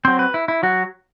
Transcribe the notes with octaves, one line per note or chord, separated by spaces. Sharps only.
F#3 C4 C5
B4
E4
E4
F#3 F#4